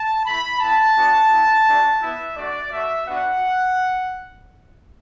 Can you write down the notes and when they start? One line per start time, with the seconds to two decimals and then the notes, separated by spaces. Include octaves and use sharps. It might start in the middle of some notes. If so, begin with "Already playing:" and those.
Already playing: A5
0.25 A3 E4 B5
0.60 B3 E4 A5
0.96 B3 D4 F#4
1.30 B3 E4
1.66 A3 D4 F#4
2.00 B3 E4 E5
2.36 A3 D4 F#4 D5
2.71 A3 F#4 E5
3.06 B3 D4 F#4 F#5